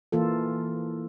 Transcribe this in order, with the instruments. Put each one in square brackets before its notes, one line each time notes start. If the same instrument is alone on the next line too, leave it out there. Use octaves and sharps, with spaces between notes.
[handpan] E3 A#3 F4 A4